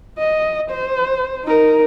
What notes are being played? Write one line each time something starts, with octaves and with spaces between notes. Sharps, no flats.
D#5
C5
D#4 A#4